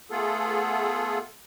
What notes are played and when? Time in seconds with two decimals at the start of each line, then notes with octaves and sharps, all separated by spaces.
0.11 A3 B3 F4 G#4 A4